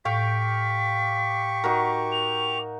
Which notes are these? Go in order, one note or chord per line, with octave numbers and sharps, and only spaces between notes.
A2 G4 F5 G5 C#6 D6 B6
D#4 F#4 A#4
F7